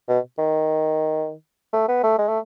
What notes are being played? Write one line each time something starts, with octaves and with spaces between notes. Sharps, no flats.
B2
D#3
A3
B3
A3
G#3
A3